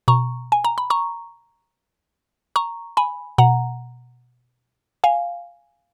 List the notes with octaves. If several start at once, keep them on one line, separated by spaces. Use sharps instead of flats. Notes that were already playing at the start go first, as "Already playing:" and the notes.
B2 A#5 C#6
G#5
A#5
B5
A#5 C#6
A#5 C#6
G#5 B5
B2 F#5 A#5
F5 G#5